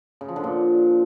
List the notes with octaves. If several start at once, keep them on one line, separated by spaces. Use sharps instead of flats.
C#3
F3
D3
A#2